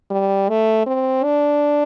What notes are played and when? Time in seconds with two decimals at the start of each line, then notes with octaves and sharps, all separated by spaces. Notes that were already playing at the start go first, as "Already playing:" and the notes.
0.11 G3
0.49 A3
0.86 C4
1.24 D4